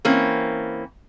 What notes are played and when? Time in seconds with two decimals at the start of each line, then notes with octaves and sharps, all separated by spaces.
0.05 E3 A#3 C4 C#4